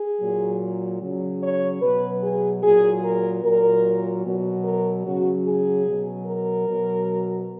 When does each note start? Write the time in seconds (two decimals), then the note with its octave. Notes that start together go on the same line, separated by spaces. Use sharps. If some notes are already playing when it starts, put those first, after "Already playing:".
Already playing: G#4
0.21 A#2 F#3
1.01 C#3 F#3
1.42 C#5
1.82 B2 F#3 B4
2.22 G#4
2.63 A#2 F#3 G#4
3.03 A#4
3.43 A#2 F#3 A#4
4.24 B2 F#3
4.64 A#4
5.05 C#3 F#3 F#4
5.45 G#4
5.86 B2 F#3
6.26 A#4
6.67 B2 F#3